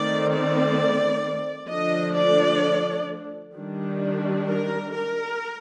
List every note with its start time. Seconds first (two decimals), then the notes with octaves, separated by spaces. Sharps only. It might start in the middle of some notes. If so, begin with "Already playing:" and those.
Already playing: D#3 A3 C4 D5
0.30 D5
1.68 D3 F3 A3 D4 D#5
2.16 D5
3.54 D#3 G3 D4
4.46 A#4
4.93 A#4